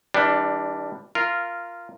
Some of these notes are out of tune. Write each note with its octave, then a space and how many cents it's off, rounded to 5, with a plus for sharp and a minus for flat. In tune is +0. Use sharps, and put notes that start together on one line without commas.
E3 -45 G3 +15 D4 +0
F4 -10 A#4 -5